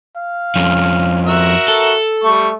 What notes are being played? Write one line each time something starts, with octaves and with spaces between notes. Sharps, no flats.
F5
F2 C#4
F#4 A#4 E5
A4
G3 A3 C#6